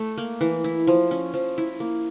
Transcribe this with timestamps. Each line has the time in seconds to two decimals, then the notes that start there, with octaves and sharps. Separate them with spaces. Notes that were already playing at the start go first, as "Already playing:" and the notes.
Already playing: A3
0.18 A#3
0.41 E3
0.64 E4
0.87 F3
1.11 C#4
1.34 F3
1.58 E4
1.80 A#3